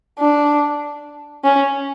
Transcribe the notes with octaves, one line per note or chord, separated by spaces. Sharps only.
D4
C#4